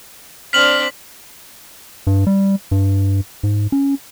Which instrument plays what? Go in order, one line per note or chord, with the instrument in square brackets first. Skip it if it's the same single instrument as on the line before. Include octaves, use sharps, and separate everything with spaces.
[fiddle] C4 D4 [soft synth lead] F6 [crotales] B6 F#7
[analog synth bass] G2
G3
G2
G#2
C#4